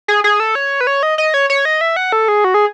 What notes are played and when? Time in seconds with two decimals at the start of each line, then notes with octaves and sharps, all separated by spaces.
0.08 G#4
0.24 G#4
0.40 A4
0.55 C#5
0.81 B4
0.87 C#5
1.03 D#5
1.18 D#5
1.34 C#5
1.50 C#5
1.65 D#5
1.81 E5
1.96 F#5
2.12 A4
2.28 G#4
2.44 F#4
2.54 G#4